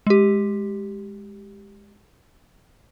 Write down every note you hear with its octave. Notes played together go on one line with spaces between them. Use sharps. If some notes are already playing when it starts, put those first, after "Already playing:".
G#3 G4